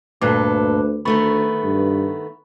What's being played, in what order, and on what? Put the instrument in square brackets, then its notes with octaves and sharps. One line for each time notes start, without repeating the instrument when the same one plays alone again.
[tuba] D2 [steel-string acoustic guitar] G2 A#2 A4 [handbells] B4 D6
[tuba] D2 [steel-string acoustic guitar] D#3 A3 B3 [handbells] B5 C#6 A6
[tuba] G2